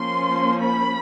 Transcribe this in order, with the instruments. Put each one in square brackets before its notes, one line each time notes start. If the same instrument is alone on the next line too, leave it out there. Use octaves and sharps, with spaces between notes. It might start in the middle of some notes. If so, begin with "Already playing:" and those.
Already playing: [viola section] F3 A#3 C#4 C6
B5